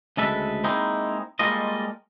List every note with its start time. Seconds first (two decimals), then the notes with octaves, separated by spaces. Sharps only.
0.17 D2 C#3 G#3 A4 B4 E5
0.64 G#3 A#3 C4 D#4 E4 G#4
1.39 G3 G#3 A#3 F4 A4 D#5